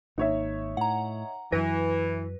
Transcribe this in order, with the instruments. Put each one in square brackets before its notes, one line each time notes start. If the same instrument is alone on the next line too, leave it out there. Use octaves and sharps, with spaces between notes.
[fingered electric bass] G#1 A#3 [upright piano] D#4 C#5 E5
[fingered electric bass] A2 [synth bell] F#5 A#5
[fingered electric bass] F#2 F#3 [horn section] E3 [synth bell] B4 [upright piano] A#6